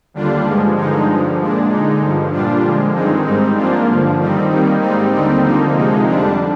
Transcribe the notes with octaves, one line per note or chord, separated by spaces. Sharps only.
D#2 D3 G3 D4 F4
G2 F3 G#3
G2 D3 F3 G#3 D#4
G2 D3 F3
A#2 G#3 D4
D3 G#3 D#4
G2 D3 F3
A#2 G3 D4 F4
D3 F3 G#3
G2 D#3 G#3 C4 D#4
G#2 G3 C4 D#4
G#2 F3 A#3 D4 F4
G2 D3 F3
D#3 G3 C4 D#4
D#3 G3 A#3 D#4
G#2 G3 C4 D#4
D#2 D3 G3 C4 D#4
D3 F3 A#3 D#4
C3 F3 G#3 D#4
F2 D3 G3 D4